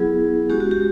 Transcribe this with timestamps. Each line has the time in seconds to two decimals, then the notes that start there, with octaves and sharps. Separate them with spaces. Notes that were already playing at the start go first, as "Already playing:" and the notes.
Already playing: F#3 B3 E4 G#4
0.49 G#3 C#4 F#4 G4
0.61 F#4
0.71 G4